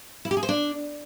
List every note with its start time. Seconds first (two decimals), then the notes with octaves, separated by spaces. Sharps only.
0.25 E4
0.31 G4
0.37 G#4
0.43 C5
0.49 D4